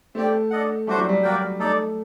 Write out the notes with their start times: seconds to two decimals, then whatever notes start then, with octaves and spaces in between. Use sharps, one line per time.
0.15 A3 C4 G4 D5 G5
0.51 D4 A4 D#5 F#5
0.87 G3 A3 D4 F#4 C5
0.98 F#3
1.09 G3
1.23 A#3 F#4 A#4 D5 G5
1.60 A3 D#4 A4 D5